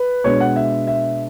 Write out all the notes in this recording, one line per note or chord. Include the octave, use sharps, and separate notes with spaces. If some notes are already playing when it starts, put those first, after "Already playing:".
Already playing: B4
B2 G#3 B3 D4 C#5
F#5
E5
E5